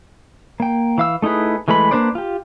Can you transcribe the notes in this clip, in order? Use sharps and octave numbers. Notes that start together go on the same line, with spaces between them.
A#3 G5
E3 F5 E6
A3 D#4 E4 G#4 B4
E3 G#3 A3 B4 B5
A#3 D4 B4 C5 D5
F4 G4